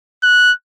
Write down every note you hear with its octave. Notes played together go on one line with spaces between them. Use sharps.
F#6